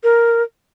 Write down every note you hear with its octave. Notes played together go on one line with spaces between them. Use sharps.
A#4